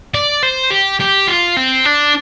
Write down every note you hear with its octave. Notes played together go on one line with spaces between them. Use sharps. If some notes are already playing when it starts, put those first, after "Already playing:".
D5
C5
G4
G4
F4
C4
D4